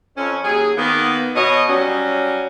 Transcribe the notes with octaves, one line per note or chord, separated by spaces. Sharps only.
F2 C#4
D#2 F#3 G#4
D#3 A#3 B3
B2 C#5 D#5
F#3 G3 C#4